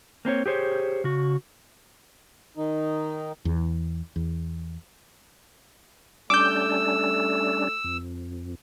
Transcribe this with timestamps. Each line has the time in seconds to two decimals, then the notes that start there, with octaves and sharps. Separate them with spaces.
0.25 A#3 C4 D4 C#5
0.46 G4 G#4 C5 C#5
1.04 C#3 F#4
2.57 D#3 D#4
3.45 E2
4.16 E2
6.30 G3 A3 C#4 D4 D6 E6 G6
7.84 F2